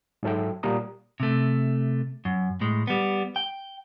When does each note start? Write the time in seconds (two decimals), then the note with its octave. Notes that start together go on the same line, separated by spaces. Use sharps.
0.23 G#2 F#3 A4 E5 G5
0.63 A#2 G3 A#3 A#5 D#6
1.20 C3 A3
2.25 F#2
2.61 A2 G#3
2.87 G3 B3
3.36 G5